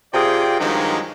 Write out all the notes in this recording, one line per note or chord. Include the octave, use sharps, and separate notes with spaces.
C3 F4 G#4 D5 G5
G2 D#3 F3 F#3 G#3